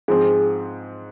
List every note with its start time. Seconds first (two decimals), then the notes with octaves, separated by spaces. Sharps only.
0.08 G#2 F3 C4 G#4